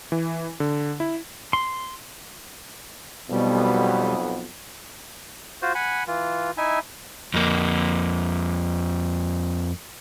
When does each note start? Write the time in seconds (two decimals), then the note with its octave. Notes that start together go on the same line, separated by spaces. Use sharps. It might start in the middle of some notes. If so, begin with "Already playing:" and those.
0.12 E3
0.60 D3
1.00 E4
1.53 C6
3.30 B1 F2 B2 G3 B3
5.62 F4 F#4 C5
5.75 F#5 G#5 B5
6.07 E3 F4
6.57 D#4 E4 E5 G#5
7.34 F2 A#3